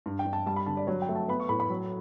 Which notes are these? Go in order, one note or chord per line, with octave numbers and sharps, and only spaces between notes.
G2
G5
G2
A5
G3 A5
B5
D3 A5
D5
F#3 C#5
G5
A3
A5
B3 B5
C#6
A2 B5
B5
F#3